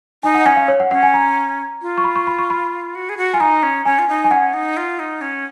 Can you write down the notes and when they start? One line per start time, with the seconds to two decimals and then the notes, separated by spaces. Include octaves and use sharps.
0.23 D#4 G#5
0.35 F#5
0.45 C#4 G#5
0.57 F5
0.68 C#5
0.80 F#5
0.91 C#4 F#5
1.03 G#5
1.14 A#5
1.82 F4
1.98 C#6
2.04 B5
2.16 C#6
2.27 B5
2.39 C#6
2.50 B5
2.95 F#4
3.09 G#4
3.17 F#4
3.33 F4 G#5
3.40 D#4 A#5
3.63 C#4
3.85 C#4 G#5
3.99 F4
4.08 D#4
4.24 G#5
4.31 C#4 F#5
4.54 D#4
4.77 F4
4.99 D#4
5.21 C#4